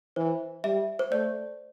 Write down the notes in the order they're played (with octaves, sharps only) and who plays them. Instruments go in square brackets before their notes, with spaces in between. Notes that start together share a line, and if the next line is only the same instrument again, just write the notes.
[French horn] E3 [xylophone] C5
[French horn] G3 [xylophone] E5
[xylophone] C5
[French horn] A3 [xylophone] D5